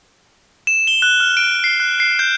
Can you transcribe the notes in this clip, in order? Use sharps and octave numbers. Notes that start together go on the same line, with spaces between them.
E7
G7
F#6
F6
D7
C7
F#6
C7
G6